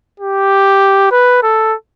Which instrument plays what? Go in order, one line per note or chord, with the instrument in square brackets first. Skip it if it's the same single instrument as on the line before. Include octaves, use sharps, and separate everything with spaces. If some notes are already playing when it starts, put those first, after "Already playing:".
[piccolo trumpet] G4
B4
A4